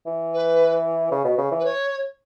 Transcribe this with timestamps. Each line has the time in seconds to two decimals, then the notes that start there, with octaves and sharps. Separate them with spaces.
0.06 E3
0.33 B4
1.11 C#3
1.25 B2
1.38 C#3
1.51 E3
1.59 B4
1.64 C#5